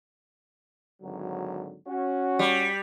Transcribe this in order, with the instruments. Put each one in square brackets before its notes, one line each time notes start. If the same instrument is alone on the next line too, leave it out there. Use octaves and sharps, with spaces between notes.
[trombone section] G#1 D3 F#3
C#4 F#4
[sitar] G3